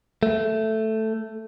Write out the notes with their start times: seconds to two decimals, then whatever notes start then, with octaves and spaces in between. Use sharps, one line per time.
0.23 A3